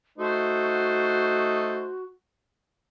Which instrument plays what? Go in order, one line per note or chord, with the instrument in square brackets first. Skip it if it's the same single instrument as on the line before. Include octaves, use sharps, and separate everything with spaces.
[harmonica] A3 D#4 C5 [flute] F#4